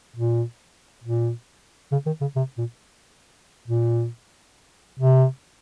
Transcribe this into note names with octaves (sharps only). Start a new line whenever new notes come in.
A#2
A#2
C#3
D#3
C#3
C3
A#2
A#2
C3